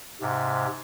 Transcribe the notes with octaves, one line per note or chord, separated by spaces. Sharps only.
G#2 C3